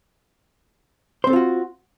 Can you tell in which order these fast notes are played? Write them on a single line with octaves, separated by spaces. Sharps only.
C5 C4 A4 F4 F#4